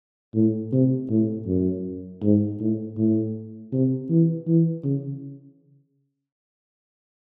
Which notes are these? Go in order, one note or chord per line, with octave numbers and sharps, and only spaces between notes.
A2
C3
A2
F#2
G#2
A2
A2
C3
E3
E3
C#3